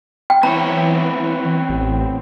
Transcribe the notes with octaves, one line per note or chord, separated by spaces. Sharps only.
G5
E3 B3 C4 C#5 A#5
A1